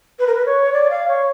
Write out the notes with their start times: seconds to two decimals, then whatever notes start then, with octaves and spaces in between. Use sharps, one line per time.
0.19 B4
0.27 A#4
0.35 B4
0.46 C#5
0.72 D5
0.90 F5
1.08 C#5